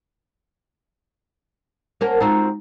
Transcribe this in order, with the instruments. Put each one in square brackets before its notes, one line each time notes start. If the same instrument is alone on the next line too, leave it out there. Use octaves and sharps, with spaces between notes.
[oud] A#3 C#4 A#4 [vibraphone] C5 F#5 A5
[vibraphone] G#3 D#4 A#5 [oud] C4 F4 F#4